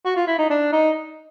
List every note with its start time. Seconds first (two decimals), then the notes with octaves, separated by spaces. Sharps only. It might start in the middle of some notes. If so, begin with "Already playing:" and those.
0.05 F#4
0.16 F4
0.27 E4
0.38 D#4
0.50 D4
0.72 D#4